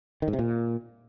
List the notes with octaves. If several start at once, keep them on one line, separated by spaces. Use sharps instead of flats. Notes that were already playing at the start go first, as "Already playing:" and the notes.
D#3
G#2
C3
A#2